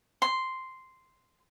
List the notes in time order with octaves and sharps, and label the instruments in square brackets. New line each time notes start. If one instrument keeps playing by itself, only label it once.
[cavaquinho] C6